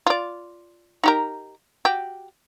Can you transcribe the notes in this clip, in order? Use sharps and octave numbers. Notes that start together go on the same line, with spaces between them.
F4 D5
D#4 G4 A#4
F#4 G4